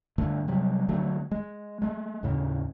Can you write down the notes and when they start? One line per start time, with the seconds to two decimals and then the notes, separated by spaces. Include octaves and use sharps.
0.18 G2 D3 A3
0.48 C3 F#3 G3
0.88 D3 F3 F#3 A3
1.31 G#3
1.82 G#3 A3
2.23 D#2 A2 C#3